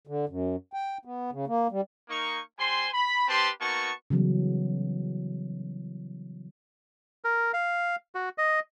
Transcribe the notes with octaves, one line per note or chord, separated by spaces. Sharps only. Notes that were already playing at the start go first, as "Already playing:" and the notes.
D3
F#2
G5
B3
C#3
A#3
G3
A#3 D#4 C#6
G3 C5 G#5 C6
B5
C4 G4 B4 A5 C6
A#3 B3 D#4 F#4 A5 C#6
C#3 E3 F#3 G3 B3
A#4
F5
F#4
D#5